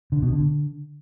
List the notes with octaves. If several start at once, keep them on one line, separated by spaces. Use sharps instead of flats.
D3
B2
D3